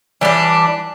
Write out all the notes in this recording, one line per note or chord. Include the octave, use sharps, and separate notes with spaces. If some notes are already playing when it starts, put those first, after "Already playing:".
E3 G3 D4